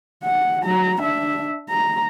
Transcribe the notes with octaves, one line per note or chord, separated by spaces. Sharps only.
F#5
F#3 A#5
D4 E5
A#5